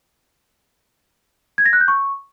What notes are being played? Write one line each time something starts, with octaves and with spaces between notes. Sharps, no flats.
G#6
A#6
F#6
G6
C#6